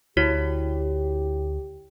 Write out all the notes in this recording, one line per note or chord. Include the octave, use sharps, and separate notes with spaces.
D2 E4 F#4 G4 C#5